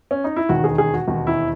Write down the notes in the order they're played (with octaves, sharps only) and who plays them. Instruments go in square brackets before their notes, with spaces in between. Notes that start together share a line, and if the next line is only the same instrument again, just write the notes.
[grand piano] C#4
D#4
E4
E1 D#2 D#3 F#4
G#4
G#4
F#4
E1 D#2 D#3 F#4
E4